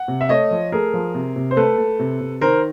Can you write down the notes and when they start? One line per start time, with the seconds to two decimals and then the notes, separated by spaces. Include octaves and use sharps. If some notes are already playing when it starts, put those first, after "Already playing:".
Already playing: F#5
0.08 C3
0.21 E5
0.29 A3 C#5 D#5
0.51 F3
0.72 A3 G#4 A#4
0.94 F3
1.14 C3
1.36 C3
1.51 C5
1.56 A3 A4 B4
1.78 A3
1.99 C3
2.21 C3
2.41 D#3 A#4 C5